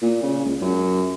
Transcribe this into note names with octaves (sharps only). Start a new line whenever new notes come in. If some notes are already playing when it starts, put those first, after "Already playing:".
A#2
C#3
C#2
F#2